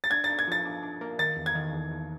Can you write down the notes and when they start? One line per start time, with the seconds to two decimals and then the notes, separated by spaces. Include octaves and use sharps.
0.04 A6
0.11 D4 G#6
0.24 A6
0.30 D4
0.39 G#6
0.48 F3 A6
0.65 D4
0.83 D4
1.01 A#3
1.19 D#3 A6
1.37 E2
1.46 G#6
1.55 D#3
1.73 E2
1.91 E2